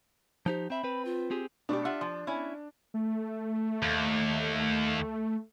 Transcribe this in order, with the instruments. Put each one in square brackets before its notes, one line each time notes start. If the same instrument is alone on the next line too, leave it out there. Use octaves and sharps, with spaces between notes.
[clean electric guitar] F3 D#4 G4 [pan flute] C5
[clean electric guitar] C4 E5 [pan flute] B5
[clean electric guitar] C4 B4
[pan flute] F4
[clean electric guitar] C4 G4 G#4
[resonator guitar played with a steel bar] B2 A3 G4 [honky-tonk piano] D4
[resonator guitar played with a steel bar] F4 E5 F#5
F3
C#4 E4
[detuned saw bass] A3
[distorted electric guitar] D#2